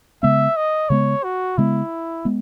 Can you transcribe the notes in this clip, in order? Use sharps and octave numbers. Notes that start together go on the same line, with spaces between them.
C#3 G#3 B3 E5
D#5
C#3 G#3 B3 C#5
F#4
C#3 G#3 B3 E4
G#3 B3